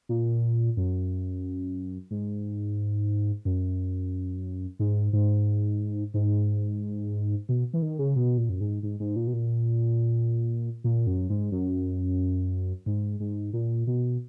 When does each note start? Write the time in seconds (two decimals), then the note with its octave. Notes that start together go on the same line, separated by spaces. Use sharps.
0.09 A#2
0.77 F#2
2.11 G#2
3.45 F#2
4.79 G#2
5.13 G#2
6.14 G#2
7.49 B2
7.74 E3
7.82 D#3
7.99 C#3
8.16 B2
8.38 A#2
8.49 F#2
8.60 G#2
8.83 G#2
9.00 G#2
9.16 A#2
9.27 B2
9.33 A#2
10.84 A#2
11.07 F#2
11.30 G#2
11.52 F#2
12.86 G#2
13.20 G#2
13.53 A#2
13.87 B2